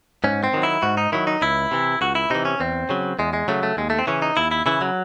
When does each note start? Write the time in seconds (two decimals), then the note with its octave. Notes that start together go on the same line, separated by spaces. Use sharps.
0.24 G#2 C#4
0.44 C4
0.54 D#3 F#3
0.63 E4
0.82 G#2 F#4
0.97 D#4
1.12 D#3 F#3 E4
1.27 D#4
1.42 C#2 E4
1.71 C3 E3
2.01 C#2 F#4
2.15 E4
2.30 C3 E3 D#4
2.45 C#4
2.60 E2 C4
2.89 C#3 F#3
3.19 E2 G#3
3.33 G#3
3.48 C#3 F#3 A3
3.63 A3
3.77 D#2 G#3
3.90 A3
3.99 C4
4.07 C#3 E3 C#4
4.22 D#4
4.37 D#2 E4
4.51 E4
4.66 C#3 E3 E4
4.81 F#3